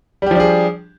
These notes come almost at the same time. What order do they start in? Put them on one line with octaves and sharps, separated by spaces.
G3 G4 F3 D4 G#4